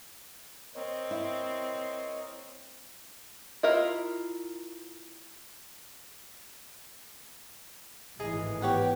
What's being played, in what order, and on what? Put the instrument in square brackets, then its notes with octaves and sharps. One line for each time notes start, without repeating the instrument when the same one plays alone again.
[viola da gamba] C4 [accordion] A#4 C#5 D#5
[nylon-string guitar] E4
[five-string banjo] E4 F4 A#4 D#5 E5
[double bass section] G#1 A2 E3 [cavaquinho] G#4 D#5 A#5
[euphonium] B3 [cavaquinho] G4 C#5 F#5 [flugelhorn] G5